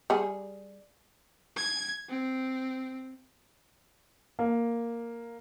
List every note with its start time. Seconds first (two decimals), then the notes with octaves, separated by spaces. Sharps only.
0.10 G3 G#4
1.57 G#6
2.09 C4
4.39 A#3